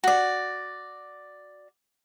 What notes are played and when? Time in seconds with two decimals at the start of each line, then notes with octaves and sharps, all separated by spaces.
0.04 F#4 D5